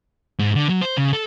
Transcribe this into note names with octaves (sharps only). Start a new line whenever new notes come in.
G#2
D3
F#3
C5
C#3
A4